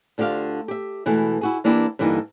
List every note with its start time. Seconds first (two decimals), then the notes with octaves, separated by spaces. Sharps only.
0.18 D2 D3 F4 G4 F5
0.68 G4 E5
1.06 B2 E3 G#3 A3 E4
1.41 E4 F#4 G#4
1.64 E3 A#3 D4 E4 G4 B4
1.99 G2 D3 E3 A#3 D#4